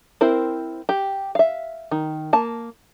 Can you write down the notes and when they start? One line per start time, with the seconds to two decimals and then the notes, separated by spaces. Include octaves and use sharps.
0.21 C4 E4 A#4 C5
0.89 G4
1.35 E5 F5
1.91 D#3
2.33 A#3 A5